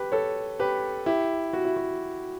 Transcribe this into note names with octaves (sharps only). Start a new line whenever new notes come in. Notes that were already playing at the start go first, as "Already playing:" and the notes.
Already playing: G4 B4
A4 C#5
G4 B4
E4 G4
F#4
E4
F#4